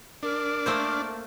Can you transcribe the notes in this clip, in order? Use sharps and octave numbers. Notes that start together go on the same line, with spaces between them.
D4 A#4
A3 A#3 C5